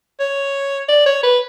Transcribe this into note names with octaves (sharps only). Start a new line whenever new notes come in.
C#5
D5
C#5
B4